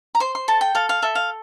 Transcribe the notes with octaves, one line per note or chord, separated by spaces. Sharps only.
A#5
C5 C6
C6
A4 A5
G5
A4 F5
F5
A4 E5
F5